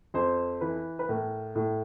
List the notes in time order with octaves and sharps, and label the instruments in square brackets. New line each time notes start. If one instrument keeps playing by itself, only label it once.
[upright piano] F2 C5
E3 B4
B4
A2 A#4
A2